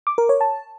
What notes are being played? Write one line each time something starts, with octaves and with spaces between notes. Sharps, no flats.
D6
A#4
C#5
A5